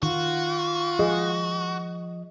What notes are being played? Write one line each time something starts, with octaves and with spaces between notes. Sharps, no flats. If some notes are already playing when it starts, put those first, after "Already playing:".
D#3 F4 F#4
F3 G#4 D#5